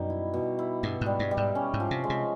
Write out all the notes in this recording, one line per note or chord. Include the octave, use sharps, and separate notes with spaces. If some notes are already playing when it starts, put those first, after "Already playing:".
Already playing: F#2 B2 G3 D#4
E4
B2
E4
G2 B2
G#2 G3
G2
G3
G#2
C#4
G#2
F3
C3
G#3
C3